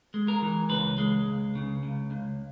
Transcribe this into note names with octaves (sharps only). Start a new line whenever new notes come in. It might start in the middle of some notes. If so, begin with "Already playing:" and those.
G#3
A#4
E3
C#2 B4
G#3
C#2
C#3
C#2
C#2